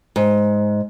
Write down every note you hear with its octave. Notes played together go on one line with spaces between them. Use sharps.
G#2